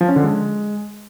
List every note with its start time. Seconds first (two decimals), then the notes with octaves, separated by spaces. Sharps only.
0.01 F3
0.08 C#4
0.16 D3
0.24 G#3